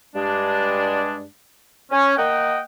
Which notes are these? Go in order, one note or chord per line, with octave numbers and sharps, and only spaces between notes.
G2 G#3 D4
C#4
A#3 D#5 F#5 G5